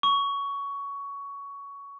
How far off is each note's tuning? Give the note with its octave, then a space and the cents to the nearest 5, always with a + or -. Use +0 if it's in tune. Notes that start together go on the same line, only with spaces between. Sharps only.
C#6 +15